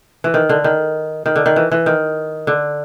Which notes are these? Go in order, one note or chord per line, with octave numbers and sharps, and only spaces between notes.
E3
D#3
D3
D#3
D#3
D3
D#3
E3
E3
D#3
D3